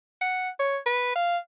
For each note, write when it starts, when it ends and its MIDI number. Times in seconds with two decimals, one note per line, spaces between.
0.21 0.49 78
0.59 0.77 73
0.86 1.11 71
1.16 1.38 77